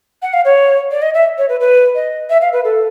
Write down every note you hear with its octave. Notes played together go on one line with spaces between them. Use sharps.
F#5
F5
C#5
D5
D#5
E5
C#5
B4
B4
D#5
E5
F5
B4
A4